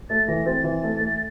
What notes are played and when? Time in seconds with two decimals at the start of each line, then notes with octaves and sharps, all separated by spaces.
0.09 A3 A6
0.27 E3 A#6
0.46 C4 A6
0.64 E3
0.83 A3
1.01 A3